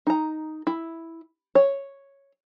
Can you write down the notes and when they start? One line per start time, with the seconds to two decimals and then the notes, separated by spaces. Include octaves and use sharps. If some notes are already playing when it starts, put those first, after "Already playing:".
0.07 D#4 A#5
0.67 E4
1.55 C#5